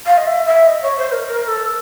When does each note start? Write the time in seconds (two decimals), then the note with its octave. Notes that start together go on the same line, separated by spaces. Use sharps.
0.06 F5
0.17 D#5
0.26 E5
0.46 E5
0.66 D#5
0.82 C#5
0.97 C5
1.11 A#4
1.27 A#4
1.47 A4